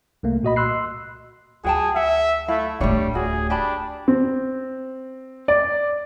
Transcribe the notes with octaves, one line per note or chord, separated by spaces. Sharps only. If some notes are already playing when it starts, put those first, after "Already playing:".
C2 A3 A#3
A#2 F#4 D#5 B5
C6 E6 F#6 C7
D2 F#4 G#4 G5 A5
E5 F#5
A3 E4 F5
D1 G3 A3 D4 C#5
F#4 G#4
D4 G4 A5 B5
C4
D5